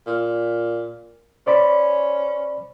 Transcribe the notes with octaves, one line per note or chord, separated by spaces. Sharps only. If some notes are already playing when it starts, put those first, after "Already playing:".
A#2
C#4 C5 D5 B5